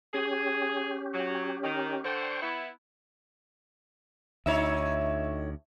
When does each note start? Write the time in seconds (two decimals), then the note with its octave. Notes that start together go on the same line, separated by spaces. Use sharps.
0.14 C#4 G4 G#4
1.14 F#3
1.64 D#3
2.04 D3 C5 G5 C#6
2.42 B3 E4
4.46 D2 A2 D#4 C#5 E5